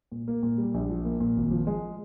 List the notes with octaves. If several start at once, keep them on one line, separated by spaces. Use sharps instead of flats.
A#2
A#3
A#2
G3
A#1
F3
A#3
A#2
G#1
F3
G#3